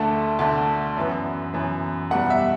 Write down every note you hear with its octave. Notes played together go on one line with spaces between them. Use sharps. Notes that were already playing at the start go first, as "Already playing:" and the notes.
Already playing: D2 D3 A3 A5
D2 D3 A3 A5
F#2 E3 B3
F#2 E3 B3
E2 B2 G3 F#5
E5